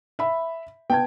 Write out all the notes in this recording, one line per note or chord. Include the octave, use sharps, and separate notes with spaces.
E5 B5
B3 G5 A5 G#6